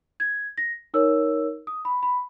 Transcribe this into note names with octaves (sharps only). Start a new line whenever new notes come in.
G#6
A#6
D#4 A#4 C#5 E6
D#6
B5
B5